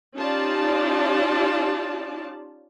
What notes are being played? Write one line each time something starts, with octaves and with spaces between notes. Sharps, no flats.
C#4 D#4 F4 G4 D5 A5